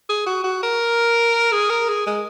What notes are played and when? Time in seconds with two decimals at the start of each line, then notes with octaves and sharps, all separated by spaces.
0.09 G#4
0.26 F#4
0.44 F#4
0.63 A#4
1.52 G#4
1.70 A#4
1.88 G#4
2.06 G#3